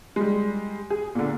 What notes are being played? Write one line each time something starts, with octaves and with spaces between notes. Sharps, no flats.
G3 G#3
G#4
A#2 D3